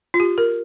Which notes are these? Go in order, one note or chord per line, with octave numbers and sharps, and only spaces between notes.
F4
G4
A#4